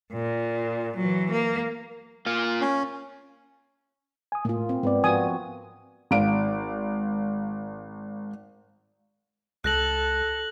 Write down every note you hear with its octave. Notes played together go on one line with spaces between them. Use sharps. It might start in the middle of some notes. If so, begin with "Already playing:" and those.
A#2
E3 F#3
A#3
A#3 F4
C#4
G#5 D#6
A2 A#3 F4
C4
G#2 B3 C4 B4 D5
F3 F4 F#4 G#5 D#6
G#1 F5 D7
C#2 A4 F#6 A#6 F#7